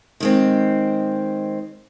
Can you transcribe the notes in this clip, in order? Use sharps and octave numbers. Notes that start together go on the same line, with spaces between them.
D#3 G#3 C4